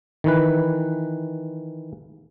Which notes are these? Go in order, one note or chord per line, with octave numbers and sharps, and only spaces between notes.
D#3 E3 B4